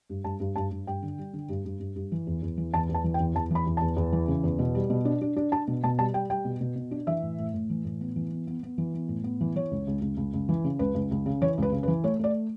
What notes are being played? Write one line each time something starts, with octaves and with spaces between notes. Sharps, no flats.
G2
G2 A5
G2
G2 A5
G2
G2 G5
D3
G3
D3
G2
G2
G2
G2
E3
E2
E2
E3
E2 A5
E2
A5
E3
G5
E2
E2 A5
E3 B5
E2
E2 A5
E2
E3
C#3
E2
B2
G3
B2
D4
D4
D4
D4 A5
B2
B2 A5
G3 A5
G3 G5
G3 G5
B2
B2
B2
D4
E3 E5
A2
A2
A2
E3
A2
B3
E3
B3
B3
B3
E3
B3
A2
B3
E3
E3 C#5
C#2
C#2
C#2
C#2
C#2
E3
C#3
C#2 B4
C#2
C#2
C#3
E3 C#5
C#2 B4
C#3
B4
E3
A3 C#5
A3 D5